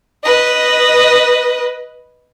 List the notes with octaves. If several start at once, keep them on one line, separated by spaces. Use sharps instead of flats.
B4 D#5